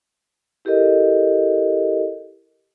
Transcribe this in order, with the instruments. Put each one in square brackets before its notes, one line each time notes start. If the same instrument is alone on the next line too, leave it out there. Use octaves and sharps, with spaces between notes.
[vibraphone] E4 G4 A4 A#4 D#5